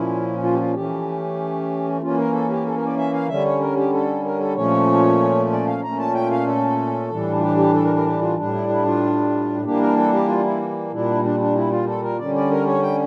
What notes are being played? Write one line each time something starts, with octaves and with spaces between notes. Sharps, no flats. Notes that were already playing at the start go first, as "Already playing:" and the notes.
Already playing: A#2 F3 C#4 E4
F4
G4
F4
E3 A3 C#4 G4
E3 A#3 C#4 F4
A#4
A4
G4
A4
A#4
D5
E5
F5
D3 G3 C#4 E5
C#5
A#4
G4
A4
A#4
A4
A#2 F3 A3 C#4 C#5
D5
F5
A#2 A3 C#4 A#5
A5
G5
F5
A4
A2 E3 G3 D4
F4
G4
G4
A4
A#4
A#4
G4
F4
A2 G3 D4
E4
E4
F4
E3 G3 A#3 D4 G4
A#4
A4
G4
F4
D4
E4
A#2 G3 D4 E4
D4
D4
E4
F4
A4
A#4
D3 G3 C#4 D5
D5
A#4
C#5
G5